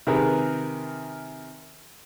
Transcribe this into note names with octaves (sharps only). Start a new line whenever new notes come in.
C3 D#3 G#4 A#4 B4